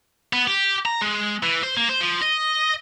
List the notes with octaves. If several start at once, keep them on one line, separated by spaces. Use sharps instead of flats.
B3
G4
A#5
G#3
E3
C5
A#3
C5
F3
D#5